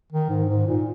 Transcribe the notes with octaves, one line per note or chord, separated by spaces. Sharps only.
D#3
G#2
G#2
A#2